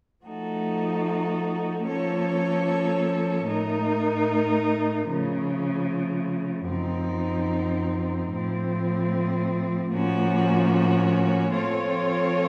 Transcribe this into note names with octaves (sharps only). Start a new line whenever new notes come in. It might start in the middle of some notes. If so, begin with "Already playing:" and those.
F3 A3 D#4 F#4 A4
F3 A#3 C#4 A4 C#5
A2 A3 D#4 A#4
C#3 F3 A3
F#2 F3 C4 D#4
A2 F3 C4
A2 F3 A#3 C#4 F#4
F3 C4 F4 A4 C#5